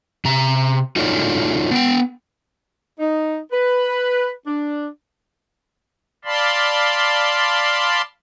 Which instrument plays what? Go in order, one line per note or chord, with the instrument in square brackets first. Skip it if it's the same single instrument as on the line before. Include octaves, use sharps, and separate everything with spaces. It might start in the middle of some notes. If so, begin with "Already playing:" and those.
[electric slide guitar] C3 A#5
D#4 F4 F#4 A4 C#5 D5
B3 G5
[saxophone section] D#4
B4
D4
[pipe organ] D5 F5 A5 B5 C6